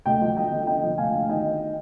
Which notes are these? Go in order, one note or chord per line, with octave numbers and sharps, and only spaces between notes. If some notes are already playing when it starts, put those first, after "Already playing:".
D2 D#5 G5
F3
F3 D#5 G5
D3
D3 D#5 G5
F3
D2 F5 G#5
D2
D#3 D#5 G5
D#3